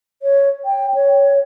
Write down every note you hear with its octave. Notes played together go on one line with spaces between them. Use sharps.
C#5
G5
C#5